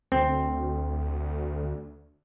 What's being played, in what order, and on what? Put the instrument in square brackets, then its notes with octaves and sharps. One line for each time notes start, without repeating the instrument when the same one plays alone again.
[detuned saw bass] D2 [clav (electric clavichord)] C4